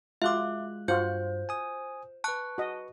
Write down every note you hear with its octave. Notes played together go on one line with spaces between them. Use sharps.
G#3 F4 F#4 E5 D6 F#6
G2 F4 F#4 C5 G6
G#5 D#6
B4 A5 C#6 F#6
F#4 D#5